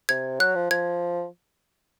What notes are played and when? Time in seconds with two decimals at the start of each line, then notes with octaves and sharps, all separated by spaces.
0.09 C3 G#6
0.40 F#3 F#6
0.55 F3
0.70 F3 G#6